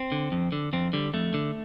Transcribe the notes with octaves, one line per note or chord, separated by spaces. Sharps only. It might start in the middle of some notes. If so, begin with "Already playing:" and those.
Already playing: C4
D3
F2
D3
F2 C4
D3 G3
F2 A3
D3